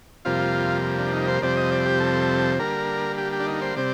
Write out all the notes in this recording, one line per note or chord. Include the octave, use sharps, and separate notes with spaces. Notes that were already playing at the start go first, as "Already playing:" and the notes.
F2 C3 G3 A#3 F4
D4
D#4
C5
F2 C3 G3 C4 D5
D#5
D5
G4
A4
D3 G3 A#3 A#4
G4
G4
D4
D#4
C5
C3 G3 C4 D5